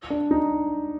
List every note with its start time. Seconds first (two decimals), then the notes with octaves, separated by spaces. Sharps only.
0.10 D4
0.31 D#4